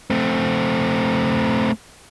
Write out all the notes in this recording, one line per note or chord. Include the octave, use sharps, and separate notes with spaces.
A3 C4